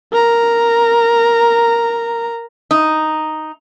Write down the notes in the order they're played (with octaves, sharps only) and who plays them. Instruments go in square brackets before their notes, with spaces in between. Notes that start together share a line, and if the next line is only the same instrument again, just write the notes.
[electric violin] A#4 A#5
[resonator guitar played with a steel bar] D#4